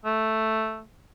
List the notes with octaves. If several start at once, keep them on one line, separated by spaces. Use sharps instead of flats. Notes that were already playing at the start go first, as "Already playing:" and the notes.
A3